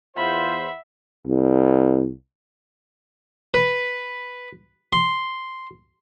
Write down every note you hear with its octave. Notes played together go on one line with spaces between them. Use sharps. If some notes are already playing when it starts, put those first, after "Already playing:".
E2 F4 C5 E5 F#5 B5
C2
B4
C6